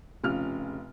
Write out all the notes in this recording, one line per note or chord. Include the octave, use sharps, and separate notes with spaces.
F1 C#3 F4 F6